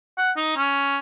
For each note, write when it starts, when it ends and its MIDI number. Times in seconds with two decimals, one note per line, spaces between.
0.18 0.31 78
0.37 0.56 63
0.57 0.98 61